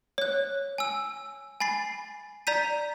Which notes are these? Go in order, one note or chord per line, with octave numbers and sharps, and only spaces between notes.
C#5 F#6
G#5 E6
G#5 B5 A6 C7
D5 A#5 G6 B6 D#7